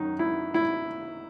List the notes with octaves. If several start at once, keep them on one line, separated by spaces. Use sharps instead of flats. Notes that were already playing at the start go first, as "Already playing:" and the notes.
Already playing: F#2 D#3 F#3 D#4
E4
E4